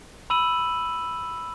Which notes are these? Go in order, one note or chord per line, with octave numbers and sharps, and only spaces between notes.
B5 E6 D#7 F#7